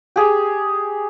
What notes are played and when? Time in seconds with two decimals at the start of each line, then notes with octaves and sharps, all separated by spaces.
0.16 G4 G#4